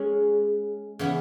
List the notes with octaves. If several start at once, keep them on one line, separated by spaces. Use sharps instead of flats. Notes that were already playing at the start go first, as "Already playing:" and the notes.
Already playing: G#3 C#4 G#4
C#3 E3 B3 G#4